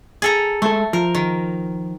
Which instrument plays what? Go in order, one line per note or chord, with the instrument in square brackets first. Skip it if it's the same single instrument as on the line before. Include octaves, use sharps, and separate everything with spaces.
[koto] G#4 A4 A#5
[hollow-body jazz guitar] G#3 A4 [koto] A3
[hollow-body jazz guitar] F3 [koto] A#4
[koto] D#3